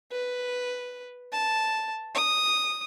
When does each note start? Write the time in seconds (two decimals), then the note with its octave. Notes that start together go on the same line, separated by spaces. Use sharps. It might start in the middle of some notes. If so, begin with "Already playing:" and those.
0.11 B4
1.32 A5
2.15 D#6